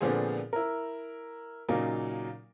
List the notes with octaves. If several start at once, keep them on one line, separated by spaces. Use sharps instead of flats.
A#2 D3 F3 B3 C4 G#4
E4 A#4
A#2 C#3 F#3 A#3 D#4